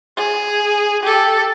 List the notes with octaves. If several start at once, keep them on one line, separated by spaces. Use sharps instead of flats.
G#4
G4 A4